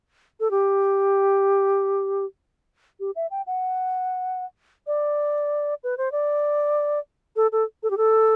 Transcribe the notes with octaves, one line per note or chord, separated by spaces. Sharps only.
A4
G4
G4
E5
G5
F#5
D5
B4
C5
D5
A4
A4
A4
G4
A4